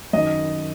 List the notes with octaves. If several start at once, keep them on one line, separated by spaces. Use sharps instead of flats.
F#2 D#3 D#5